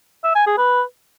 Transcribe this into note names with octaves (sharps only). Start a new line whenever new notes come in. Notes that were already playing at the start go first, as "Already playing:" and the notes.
E5
G#5
G#4
B4